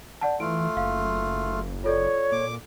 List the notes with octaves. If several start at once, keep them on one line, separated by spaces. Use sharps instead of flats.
D5 F#5 A5
E3 A3 F4 D7
F#1 F5
F4 A4 C#5 D5
A#2 D6